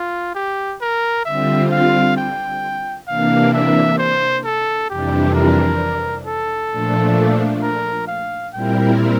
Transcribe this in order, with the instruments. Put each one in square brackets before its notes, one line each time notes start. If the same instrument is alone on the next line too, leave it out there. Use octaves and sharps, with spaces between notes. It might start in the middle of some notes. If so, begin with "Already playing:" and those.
Already playing: [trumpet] F4
G4
A#4
[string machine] D3 G3 C4 F4 [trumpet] E5
[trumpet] F5
G5
[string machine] C3 E3 A#3 D4 [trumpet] F5
[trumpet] E5
C5
A4
[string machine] F2 C3 E3 G3 D4 [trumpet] G4
[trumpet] A#4
A4
[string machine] A#2 F3 A3 D4
[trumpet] A#4
F5
[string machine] A#2 G3 C4 E4 A#4 [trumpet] G5